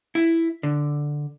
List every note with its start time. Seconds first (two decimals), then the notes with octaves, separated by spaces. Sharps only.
0.15 E4
0.63 D3